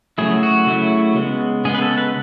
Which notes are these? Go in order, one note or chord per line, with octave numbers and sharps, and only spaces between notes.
C#3 F#3 A3 E4 G#4
F#4
C#3 F#3 A3 E4
C#3 G#3 B3
C#3 G#3 B3 G#4
B4
A4
B4